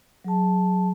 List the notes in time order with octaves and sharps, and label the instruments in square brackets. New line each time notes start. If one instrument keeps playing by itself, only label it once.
[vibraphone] F#3 G#4 A5